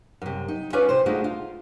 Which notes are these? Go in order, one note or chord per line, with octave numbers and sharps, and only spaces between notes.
F#2 C3
D#4
C#4 F4 B4 C#5 D5 G#5
C3 C5
G#3 A3 D4 D#4 F4 F#4
F4